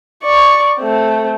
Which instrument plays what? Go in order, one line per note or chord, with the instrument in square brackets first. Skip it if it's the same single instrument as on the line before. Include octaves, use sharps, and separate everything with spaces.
[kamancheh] D5 C#6
A3 C4